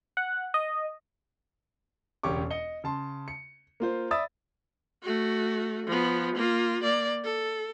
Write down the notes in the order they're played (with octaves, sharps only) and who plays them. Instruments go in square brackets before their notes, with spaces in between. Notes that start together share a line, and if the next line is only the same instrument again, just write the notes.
[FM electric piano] F#5
D#5
[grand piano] E1 C#2 C#4 G4 C#6 D6
D#5 C#7 G7
C#3 A5 C6
C#7
A#3 F4 C5
D5 E5 B5 D#6 E6 A6
[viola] A3 F#4
F3 B3
A#3 F4
A#3 D5
A4